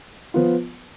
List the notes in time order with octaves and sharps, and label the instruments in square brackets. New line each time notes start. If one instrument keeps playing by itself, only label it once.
[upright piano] F3 B3 F4